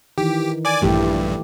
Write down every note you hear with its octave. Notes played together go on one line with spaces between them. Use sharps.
D#3 E3 G4
D5 G#5 D6
A#1 G2 E3 A3 G4